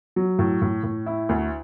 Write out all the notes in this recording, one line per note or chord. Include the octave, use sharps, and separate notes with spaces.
F#3
A2
A2
A2
E4
D2